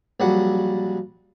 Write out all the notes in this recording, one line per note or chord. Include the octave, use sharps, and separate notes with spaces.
A#1 F#3 G3 F#5